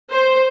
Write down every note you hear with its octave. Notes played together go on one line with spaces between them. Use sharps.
C5